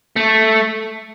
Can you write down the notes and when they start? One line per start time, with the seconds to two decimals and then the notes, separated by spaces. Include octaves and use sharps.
0.16 A3